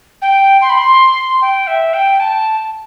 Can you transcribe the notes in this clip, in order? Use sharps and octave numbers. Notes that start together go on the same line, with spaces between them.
G5
C6
B5
C6
G5
E5
G5
A5